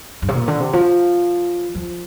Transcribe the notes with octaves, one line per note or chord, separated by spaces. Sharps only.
G2
C3
A#2
D3
C3
F3
F3